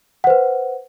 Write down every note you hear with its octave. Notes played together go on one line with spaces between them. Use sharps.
B4 C5 F#5